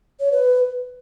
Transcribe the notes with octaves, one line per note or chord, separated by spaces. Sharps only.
C#5
B4